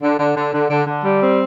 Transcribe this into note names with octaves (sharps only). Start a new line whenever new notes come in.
D3
D3
D3
D3
D3
D3
G3
C4